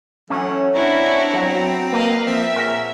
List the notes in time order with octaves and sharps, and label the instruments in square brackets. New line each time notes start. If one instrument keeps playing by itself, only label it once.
[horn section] E3 A3 A4 [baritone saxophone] F#3 [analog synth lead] C#4
[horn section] B3 A5 A#5 [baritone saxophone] C4 [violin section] D4 E4 F#4
[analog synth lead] F#3
[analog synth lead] A#3 [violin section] B4 D#5 F5
[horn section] F3 [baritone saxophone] C4 [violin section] E5
[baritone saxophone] A#2 [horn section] G#4 C#5 F#5 [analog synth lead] A#4